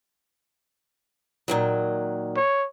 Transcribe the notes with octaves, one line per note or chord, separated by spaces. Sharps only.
A#2 D#3 F#3
C#5